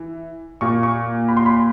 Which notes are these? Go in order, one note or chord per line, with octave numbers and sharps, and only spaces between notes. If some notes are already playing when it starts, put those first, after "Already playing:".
Already playing: E3
A#2 C#6
C#6
B5
C6
B5